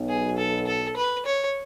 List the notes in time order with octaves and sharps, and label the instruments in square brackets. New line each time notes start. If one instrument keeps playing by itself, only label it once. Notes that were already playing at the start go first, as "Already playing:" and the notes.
Already playing: [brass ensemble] B1 B2
[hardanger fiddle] G#4
A4
A4
B4
C#5